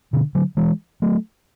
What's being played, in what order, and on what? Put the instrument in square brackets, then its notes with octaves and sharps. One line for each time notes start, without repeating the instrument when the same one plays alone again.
[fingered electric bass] B2 D3
D3 F#3
E3 G#3
F#3 A3